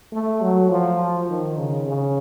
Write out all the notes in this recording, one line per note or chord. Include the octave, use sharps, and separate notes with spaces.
A3
F#3
F3
D#3
C#3
C#3